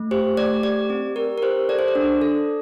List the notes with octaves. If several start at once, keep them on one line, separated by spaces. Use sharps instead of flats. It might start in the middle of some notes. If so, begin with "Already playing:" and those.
Already playing: A3
G4 C5
A3 D5
G4 D5
C4
G4 A#4
A#4
G4 C5
A4 D5
C5
D5
D4
A4